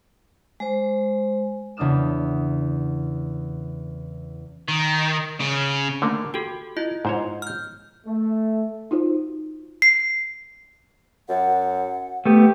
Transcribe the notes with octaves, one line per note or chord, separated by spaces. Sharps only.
G#3 C5
E2 C#3 D4 D#6 F6 E7
D#3
C#3
D3 A3 A#3
F#4 G4 A4 G5
E4 F4 D#5
G#2 C5 C#5
F6 G6
A3
D#4 F4 F#4 C5
C7
F#2 F#5
A3 B3 G4